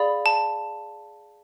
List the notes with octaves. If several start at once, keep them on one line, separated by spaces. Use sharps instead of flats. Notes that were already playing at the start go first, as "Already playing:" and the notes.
Already playing: G#4 D5 F5 B5
A5